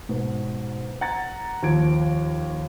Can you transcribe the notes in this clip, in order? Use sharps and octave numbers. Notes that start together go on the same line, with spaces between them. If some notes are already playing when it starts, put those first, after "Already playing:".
G#2 B2
F#5 A#5 G#6 A6
D#2 F3 G#6 D7